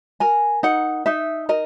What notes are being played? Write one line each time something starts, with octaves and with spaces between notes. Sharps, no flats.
A#4 G#5
D#4 F#5
D#4 E5
A#4 D#5